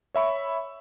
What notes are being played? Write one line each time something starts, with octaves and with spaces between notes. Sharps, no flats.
C#5 E5 B5 C#6